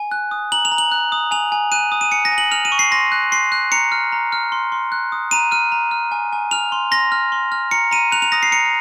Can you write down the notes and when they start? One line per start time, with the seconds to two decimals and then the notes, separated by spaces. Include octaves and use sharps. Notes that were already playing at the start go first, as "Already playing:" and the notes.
Already playing: G#5
0.11 F#6
0.31 D#6
0.52 A#5 F#7
0.65 F7
0.72 A#5
0.78 F#7
0.92 F#6
1.12 D#6
1.31 G#5 F7
1.52 G#5
1.72 F#6 D#7
1.92 D#6
2.01 D#7
2.11 G#5 C#7
2.25 A#6
2.32 G#5
2.38 F#7
2.51 F6 F7
2.65 D#7
2.72 C#6
2.79 C7
2.91 C6 A#6
3.12 F#6
3.32 C6 C7
3.52 F#6
3.72 A#5 C#7
3.92 F6
4.12 A#5
4.32 F6
4.52 C6
4.72 C6
4.92 F#6
5.12 D#6
5.31 A#5 D#7
5.52 F6 D#7
5.72 A#5
5.91 F6
6.12 G#5
6.33 G#5
6.51 F6 F7
6.72 C6
6.91 C6 A#6
7.12 F6
7.32 C6
7.52 F6
7.71 A#5 C#7
7.91 A#5 D#7
8.12 F#6 F7
8.22 F7
8.32 D#6 A#6
8.43 C7
8.52 A#5 C#7